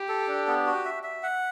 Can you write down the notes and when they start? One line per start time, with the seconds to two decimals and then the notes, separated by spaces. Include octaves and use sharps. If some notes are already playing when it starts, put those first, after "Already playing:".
Already playing: G4
0.09 A4
0.27 D4
0.47 B3
0.66 F#4
0.85 E5
1.03 E5
1.23 F#5